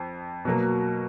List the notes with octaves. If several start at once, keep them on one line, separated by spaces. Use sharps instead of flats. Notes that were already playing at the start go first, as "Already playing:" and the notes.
Already playing: F2
B2 F#3 A#3